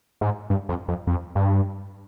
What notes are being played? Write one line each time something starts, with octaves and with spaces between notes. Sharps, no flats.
G#2
G2
F2
F2
F2
G2